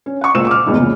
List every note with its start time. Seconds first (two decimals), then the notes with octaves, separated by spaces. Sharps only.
0.06 C#4
0.21 F#5 C#6
0.34 C#2 A#2 A#3 C5 E6 E7
0.47 D6 F6
0.66 F1 E2 G#2 B2
0.77 A#2 C#3